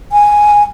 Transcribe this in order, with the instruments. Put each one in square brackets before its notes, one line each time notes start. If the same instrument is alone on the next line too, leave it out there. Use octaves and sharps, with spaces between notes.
[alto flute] G#5